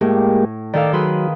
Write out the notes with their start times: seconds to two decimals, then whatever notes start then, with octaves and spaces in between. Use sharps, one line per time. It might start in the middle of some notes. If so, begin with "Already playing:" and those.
0.01 A2 G#3 A#3 G4
0.74 D#3 A4 D5 F5
0.93 F#3 G#4 B4 C6